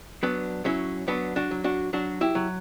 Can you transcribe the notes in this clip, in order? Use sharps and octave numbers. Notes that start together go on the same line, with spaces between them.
F#3 B3 D4
F#3 C#4 E4
F#3 B3 D4
D4 F#4
F#3
D4 F#4
F#3 D4 F#4
E4 G4
F#3